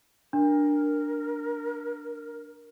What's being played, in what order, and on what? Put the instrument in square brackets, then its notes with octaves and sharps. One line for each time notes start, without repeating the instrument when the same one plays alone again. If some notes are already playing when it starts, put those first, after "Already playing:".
[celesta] D4 [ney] A#4